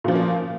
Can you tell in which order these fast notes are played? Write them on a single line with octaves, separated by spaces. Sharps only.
A#2 F3 C#4 A#3